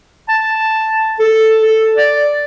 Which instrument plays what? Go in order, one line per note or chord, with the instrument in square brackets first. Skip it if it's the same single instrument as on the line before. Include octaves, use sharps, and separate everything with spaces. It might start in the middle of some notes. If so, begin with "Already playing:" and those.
[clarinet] A5
A4
A4
D5